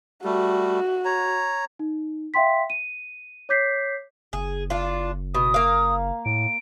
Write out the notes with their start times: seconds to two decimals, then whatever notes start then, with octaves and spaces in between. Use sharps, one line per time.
0.24 G3 A3 F#4
1.05 C#5 A#5
1.79 D#4
2.34 E5 F5 G5 C6 B6
2.70 D#7
3.49 C#5 D6 G6 B6 C7
4.33 F#1 G#4
4.70 D4 F4
5.35 B2 D#6
5.54 A#3 F5
6.25 A2 D7